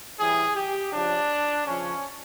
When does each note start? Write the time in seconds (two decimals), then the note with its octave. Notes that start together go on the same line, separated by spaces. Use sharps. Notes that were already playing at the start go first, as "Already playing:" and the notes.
0.18 A2 E3 G3 G#4
0.55 G4
0.92 C#3 F3 D4
1.66 C#3 F3 C#4